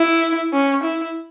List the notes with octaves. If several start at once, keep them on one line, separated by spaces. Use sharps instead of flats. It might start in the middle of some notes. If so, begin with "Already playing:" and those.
Already playing: E4
C#4
E4